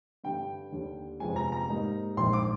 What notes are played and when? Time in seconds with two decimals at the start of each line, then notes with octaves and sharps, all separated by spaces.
0.24 G2 D3 G3 G5
0.72 D#2 D3 G3
1.20 G1 F2 C3 F3 G#3 G#5
1.36 A#5
1.52 A#5
1.68 G#2 G3 A#3 D#4
2.17 A#1 G#2 D#3 C6
2.33 D6